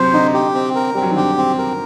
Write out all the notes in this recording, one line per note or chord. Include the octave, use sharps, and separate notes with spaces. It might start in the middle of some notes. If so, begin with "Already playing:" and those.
Already playing: C3 F#3 C5
D3 D#4
G4
C4
A#4
G3 C4
F#3
D#3
D3 G4
C4
A#4